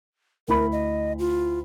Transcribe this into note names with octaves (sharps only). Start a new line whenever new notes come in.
D2 E4 A#4 B5
D#5
F4